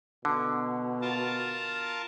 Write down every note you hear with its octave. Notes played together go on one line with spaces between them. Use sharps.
B2 D3
F4 A#4 A5